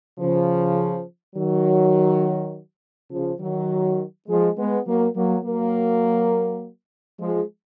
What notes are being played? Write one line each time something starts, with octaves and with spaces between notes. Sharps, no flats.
C#3 F3
D#3 F#3
C#3 F3
D#3 F#3
F3 G#3
G#3 B3
F#3 A#3
F#3 A#3
F#3 A#3
F3 G#3